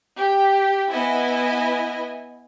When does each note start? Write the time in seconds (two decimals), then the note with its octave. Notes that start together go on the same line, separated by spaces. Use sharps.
0.20 G4
0.90 B3 E4 D#5 G#5